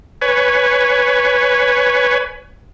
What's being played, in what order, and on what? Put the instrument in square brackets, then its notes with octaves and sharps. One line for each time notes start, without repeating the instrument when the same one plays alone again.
[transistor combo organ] B4 C#5 G#5